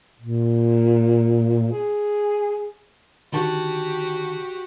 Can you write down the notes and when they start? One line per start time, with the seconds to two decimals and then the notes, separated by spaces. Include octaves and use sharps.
0.20 A#2
1.72 G#4
3.32 D3 D#3 F#4 G4 A5